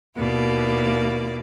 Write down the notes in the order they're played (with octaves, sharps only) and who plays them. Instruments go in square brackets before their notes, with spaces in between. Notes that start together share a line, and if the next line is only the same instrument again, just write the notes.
[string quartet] D#2 B2 A#3 E4 D5